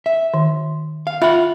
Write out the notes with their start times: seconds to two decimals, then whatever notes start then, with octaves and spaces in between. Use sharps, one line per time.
0.06 E5
0.34 D#3
1.07 F5
1.22 F4 E5 F#5 B5